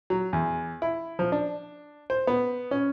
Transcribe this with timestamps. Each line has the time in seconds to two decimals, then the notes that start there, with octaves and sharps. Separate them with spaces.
0.10 F#3
0.33 E2
0.82 E4
1.19 F3
1.32 D4
2.10 C5
2.27 B3
2.71 C#4